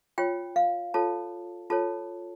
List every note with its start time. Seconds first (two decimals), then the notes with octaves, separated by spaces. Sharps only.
0.18 F4 C#5 G5
0.56 F5
0.94 F4 A4 C#5 A5
1.70 F4 A4 C#5 A5